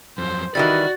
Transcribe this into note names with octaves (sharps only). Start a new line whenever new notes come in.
F2 F#3 C5
D#3 E3 G3 F#4 D5 A6